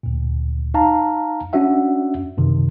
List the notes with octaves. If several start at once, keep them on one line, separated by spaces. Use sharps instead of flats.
D2 A#2
D#4 F5 A5 A#5
C#4 D4 F#4 E5 F#5
F#2 C3 D#3